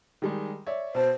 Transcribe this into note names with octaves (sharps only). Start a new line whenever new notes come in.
D#3 G3 G#3
C#5 D5 E5
B2 C5 A5